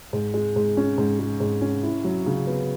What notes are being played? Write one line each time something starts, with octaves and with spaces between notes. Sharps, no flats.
G#2
G#3
G#2
C#4
G#2
G#3
G#2
C#4
E4
F#3
C#3
B3